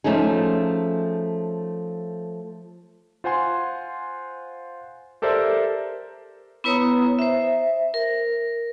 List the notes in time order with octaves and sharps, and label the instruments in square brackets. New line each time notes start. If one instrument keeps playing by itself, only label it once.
[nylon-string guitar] F3 A3 C#4 D#4 G#4
[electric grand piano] F4 C5 F#5 G#5 C6
G4 A4 A#4 C5 D5 E5
[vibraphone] B3 E4 B4 C#5 A#5 D#6
C5 E5
A#4